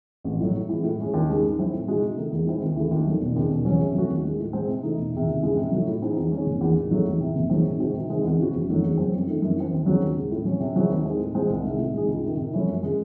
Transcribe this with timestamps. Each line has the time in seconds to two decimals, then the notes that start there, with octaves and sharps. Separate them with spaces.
0.24 A1
0.40 A2 F#3
0.54 A2
0.69 E3 G#3
0.83 A2
0.99 G#3 C#4 G#4
1.14 D#2
1.29 C#3 G#3 D#4
1.43 G#2
1.58 F#3 C4 E4
1.72 A2
1.88 G#3 D#4 F#4
2.02 C3
2.17 D#3 A3 D#4
2.31 E2
2.46 D#3 G#3 C4 E4
2.62 D#2
2.76 C#3 E3 A3
2.91 D#2
3.06 D#3 F#3 A3
3.21 E1
3.35 D#2 C#3
3.50 E1
3.65 E2 C#3 F#3 C#4
3.79 C3
3.94 F#3 A3 C#4 F#4
4.09 D#2
4.25 D#3 G#3
4.39 A2
4.53 G#3 C4
4.68 C3
4.83 E3 A3 D#4
4.98 E1
5.13 E2 C3
5.27 D#2
5.42 C#3 E3 G#3
5.57 C3
5.72 F#3 A3 D#4 F#4
5.87 A2
6.02 E3 C4 D#4 G#4
6.17 E2
6.31 D#3 G#3 C#4
6.46 F#1
6.61 E2 D#3
6.76 A1
6.91 G#2 F#3 A3
7.05 E2
7.21 C3 E3
7.35 F#1
7.49 E2 D#3 F#3 C4
7.65 C3
7.79 D#3 G#3 C4 F#4
7.93 C3
8.09 D#3 G#3 C4
8.24 E2
8.38 C#3 E3 C4 F#4
8.53 F#1
8.69 F#2 D#3 F#3 A3
8.83 E2
8.98 C#3 F#3 C4
9.12 F#2
9.27 D#3 A3 D#4
9.42 F#2
9.56 E3 C4
9.71 D#2
9.86 C#3 F#3 C4 F#4
10.01 D#2
10.17 C#3 G#3
10.31 A2
10.45 F#3 C#4
10.60 C3
10.76 F#3 C4 E4 G#4
10.90 D#2
11.05 D#3 G#3 C4
11.19 A2
11.34 E3 G#3 C4
11.50 C2
11.63 C3 D#3 G#3
11.78 A2
11.94 G#3 D#4 G#4
12.08 C#2
12.23 C3 D#3
12.37 C3
12.53 F#3 A3 C#4 E4
12.67 F#2
12.83 C#3 G#3